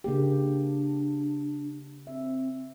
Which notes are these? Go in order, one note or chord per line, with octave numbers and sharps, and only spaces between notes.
C#3 A#3 D4 G4
C4 E5